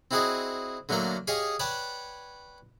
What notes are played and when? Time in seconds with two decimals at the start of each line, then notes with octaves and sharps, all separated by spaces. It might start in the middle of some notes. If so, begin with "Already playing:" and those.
0.11 C4 E4 F#4 G#4 D5 D#5
0.89 D3 F#3 A3 A#3 A#4 D5
1.27 G4 G#4 C#5 D#5 F5 C#6
1.60 B4 C#5 D5 F#5 G5 A5